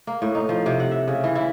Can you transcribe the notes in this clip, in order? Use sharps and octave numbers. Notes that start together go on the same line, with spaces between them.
A#3
A2
D#4
F3
C3
F#5
E5
C#3
E3
E4